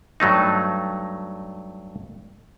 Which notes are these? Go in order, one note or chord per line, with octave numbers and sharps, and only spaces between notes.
G2 F#3 A3 D#4